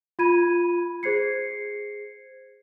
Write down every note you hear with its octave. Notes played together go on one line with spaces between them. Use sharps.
F4 B5 G#6 D#7
G#4 C5 G#6 C7 C#7